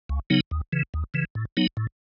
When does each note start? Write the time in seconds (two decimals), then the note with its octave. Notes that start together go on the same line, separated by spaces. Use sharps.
0.09 C#2
0.30 C#3 F#3 B3 D#4
0.51 D#2
0.72 C#3 E3
0.94 D#2
1.14 C#3 E3
1.35 A2
1.57 F#3 B3 D#4
1.77 A2